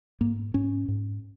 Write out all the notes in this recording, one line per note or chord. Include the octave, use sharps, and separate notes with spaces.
G#2 A#3
G#2 C#4
G#2